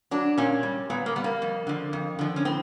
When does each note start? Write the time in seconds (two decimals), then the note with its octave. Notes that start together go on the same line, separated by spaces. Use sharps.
0.11 F#3 D4
0.38 A#2 C#4
0.63 G3
0.90 A#2 B3
1.06 A#3
1.16 G3 B3
1.24 A#3
1.42 F2
1.67 D3 F3
1.93 F2
2.19 D3 F3
2.36 C#4
2.45 A2 C4